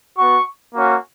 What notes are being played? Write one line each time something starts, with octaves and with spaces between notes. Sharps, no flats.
B3 F#4 C#6
A#3 C#4 F#4